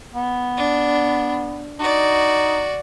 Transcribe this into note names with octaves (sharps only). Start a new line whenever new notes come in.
B3
D4
D#4 F#4 D5